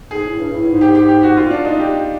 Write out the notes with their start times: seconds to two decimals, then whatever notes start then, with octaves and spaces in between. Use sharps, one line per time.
0.10 G#2 G#4
0.24 A2
0.39 G2
0.53 A2
0.68 G#2
0.81 G4
0.95 G4
1.09 G4
1.23 F#4
1.37 F4
1.51 D4
1.65 D#4
1.80 G4